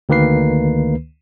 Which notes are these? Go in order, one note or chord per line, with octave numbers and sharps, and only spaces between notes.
D2 D#3 A#3 B4 C7